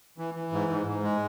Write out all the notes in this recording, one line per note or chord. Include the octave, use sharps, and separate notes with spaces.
E3
E3
G#2
G#2
G#2
G#3